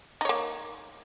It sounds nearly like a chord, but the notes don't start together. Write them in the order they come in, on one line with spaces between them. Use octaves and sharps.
D#4 C#5 A#3